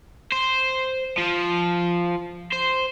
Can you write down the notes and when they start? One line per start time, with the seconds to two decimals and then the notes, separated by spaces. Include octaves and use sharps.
0.32 C5
1.18 F3
2.52 C5